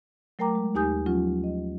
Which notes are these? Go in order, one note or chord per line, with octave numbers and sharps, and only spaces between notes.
F#3 A3 A#4 G5 A#5 D6
G#3
D#2 D#4 G4 G#5 D#6 G6
F3 F#3 C#4 F4
D#5